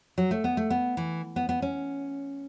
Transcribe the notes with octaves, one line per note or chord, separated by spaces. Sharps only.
F#3
A3
B3
A3
B3
E3
B3
B3
C#4